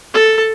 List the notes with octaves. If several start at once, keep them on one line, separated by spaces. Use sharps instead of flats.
A4